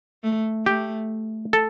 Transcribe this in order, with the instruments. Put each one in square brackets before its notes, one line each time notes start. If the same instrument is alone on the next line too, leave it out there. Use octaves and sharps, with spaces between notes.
[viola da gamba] A3
[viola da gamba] A3 [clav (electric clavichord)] G4
[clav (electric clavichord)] A4